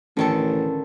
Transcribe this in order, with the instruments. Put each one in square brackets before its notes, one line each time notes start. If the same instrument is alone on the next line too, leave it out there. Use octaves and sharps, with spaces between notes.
[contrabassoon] A1 [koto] D3 D#3 A4